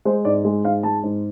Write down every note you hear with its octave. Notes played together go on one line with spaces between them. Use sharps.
G#3 C5
G#2 D5
G#3
G#2 F5
G#3 A5
G#2